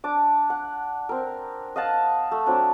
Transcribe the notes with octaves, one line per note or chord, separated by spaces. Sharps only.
D4 D6
F#5
C4 A#4
D#5 F5 F#5 A5
A3
F#3 C4 D4